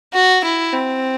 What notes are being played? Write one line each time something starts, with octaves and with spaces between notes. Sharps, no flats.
F#4
E4
C4